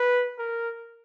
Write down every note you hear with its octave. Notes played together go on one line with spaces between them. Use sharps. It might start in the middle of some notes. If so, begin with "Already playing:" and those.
Already playing: B4
A#4